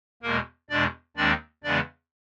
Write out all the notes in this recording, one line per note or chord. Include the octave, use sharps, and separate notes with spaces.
E2 B2 G#3 A#3 A#4
E2 B2 G#3 D4 D5
D#2 D#3 G#3 C4 D4 D5
E2 C#3 E3 G#3 B3 D4 D5